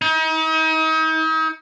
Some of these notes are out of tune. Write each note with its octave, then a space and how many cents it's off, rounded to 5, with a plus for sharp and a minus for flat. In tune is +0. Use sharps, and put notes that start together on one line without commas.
D#4 +40